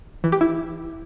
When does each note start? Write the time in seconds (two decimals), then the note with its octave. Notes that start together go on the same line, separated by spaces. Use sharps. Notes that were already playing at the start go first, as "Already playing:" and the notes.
0.24 E3
0.32 G4
0.41 E4